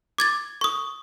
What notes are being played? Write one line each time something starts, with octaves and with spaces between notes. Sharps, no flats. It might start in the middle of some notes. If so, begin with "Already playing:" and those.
D6 G#6 A6
C#6 D#6